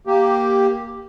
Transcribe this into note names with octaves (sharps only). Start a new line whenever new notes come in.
A#3 G4